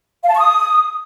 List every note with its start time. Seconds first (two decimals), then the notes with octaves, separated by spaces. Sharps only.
0.23 F5
0.28 A5
0.34 C#6
0.39 D#6